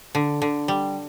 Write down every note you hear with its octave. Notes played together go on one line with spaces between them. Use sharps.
D3
D3
G3